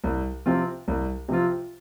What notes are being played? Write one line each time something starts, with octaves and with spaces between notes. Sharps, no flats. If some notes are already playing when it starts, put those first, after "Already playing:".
C2
C3 F3 C4 F4
C2
C3 F3 C4 F4